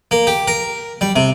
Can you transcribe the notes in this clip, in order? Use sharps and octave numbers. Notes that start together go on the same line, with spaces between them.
A#3
G4
A#4
G3
C3